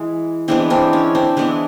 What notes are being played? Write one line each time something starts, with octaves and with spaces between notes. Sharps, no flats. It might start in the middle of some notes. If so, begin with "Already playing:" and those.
Already playing: E3 G#3
E3 G#3 B3 C4 D4
C4 D4
C#4
C4 D4
E3 G#3 B3 D4 E4